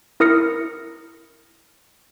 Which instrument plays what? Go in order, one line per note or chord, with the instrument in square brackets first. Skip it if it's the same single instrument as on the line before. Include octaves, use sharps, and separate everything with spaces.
[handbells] E4 A#4 D#6 F6 A#6 C#7